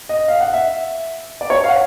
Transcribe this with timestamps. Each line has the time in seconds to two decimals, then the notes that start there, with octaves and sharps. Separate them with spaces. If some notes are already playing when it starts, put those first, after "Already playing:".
0.09 D#5
0.28 F5
0.41 F#5
0.53 E5
1.41 D5
1.50 C#5
1.64 F5
1.68 F#5